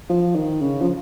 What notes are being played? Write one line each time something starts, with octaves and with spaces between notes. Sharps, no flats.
F3
D#3
C#3
F3